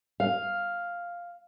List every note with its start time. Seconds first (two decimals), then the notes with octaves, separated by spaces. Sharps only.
0.20 F5